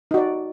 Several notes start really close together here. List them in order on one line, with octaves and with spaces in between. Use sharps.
D#4 F#4 D5